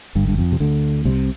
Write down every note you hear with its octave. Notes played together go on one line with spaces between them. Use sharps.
G1 G2
G2
F2
C3
D2 D3
C2 C3